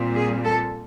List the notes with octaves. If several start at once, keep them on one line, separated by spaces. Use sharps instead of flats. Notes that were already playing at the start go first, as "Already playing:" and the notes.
Already playing: A#2 G3 C4
G#4
A4